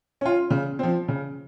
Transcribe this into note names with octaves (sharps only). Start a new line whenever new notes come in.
C#4 F4
C#3
F3 C4
C#3